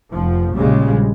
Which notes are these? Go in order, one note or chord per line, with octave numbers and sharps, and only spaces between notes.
F1 F3
A#1 C#3 G3 G#3